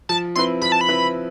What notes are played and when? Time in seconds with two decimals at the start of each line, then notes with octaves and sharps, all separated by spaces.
0.09 F3 A5
0.35 C4 E4 B4 C6
0.61 F3 B5
0.72 A5
0.81 B5
0.89 C4 E4 B4